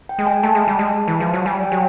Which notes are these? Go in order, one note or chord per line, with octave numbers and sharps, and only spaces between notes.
G5
G#3
G#5
A3 A5
G#3
G3
G#3
E3
F3
F#3
G3 G#5
G5
F#3